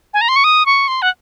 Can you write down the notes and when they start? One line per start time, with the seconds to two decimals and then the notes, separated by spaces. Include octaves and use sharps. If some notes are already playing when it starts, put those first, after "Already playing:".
0.14 G#5
0.21 A#5
0.29 C6
0.36 C#6
0.44 D#6
0.66 C#6
0.88 C6
1.02 F#5